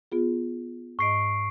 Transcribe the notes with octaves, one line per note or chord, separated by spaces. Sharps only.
B3 F4 G#4
G#2 D#5 C#6 C7 D7